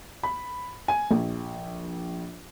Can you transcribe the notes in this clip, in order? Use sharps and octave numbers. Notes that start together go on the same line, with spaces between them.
B5
G#5
A#1